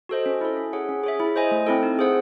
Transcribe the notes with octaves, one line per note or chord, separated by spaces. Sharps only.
F#4 A4 C5 D#5
C#4
E4 A4
C#4
G#4 C#5 F#5
C#4
G#4 C#5 E5
E4
C5 D#5 G#5
A3
C4 E4 A4
D#4
G#4 C5 F#5